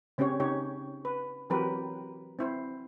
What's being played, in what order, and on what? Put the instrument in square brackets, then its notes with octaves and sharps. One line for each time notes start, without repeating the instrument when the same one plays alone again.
[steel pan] C#3 C4 C#4 G4 C#5
C#3 D#4 G4 C#5
B4
E3 F#3 C4 G4 A#4 B4
C4 E4 C5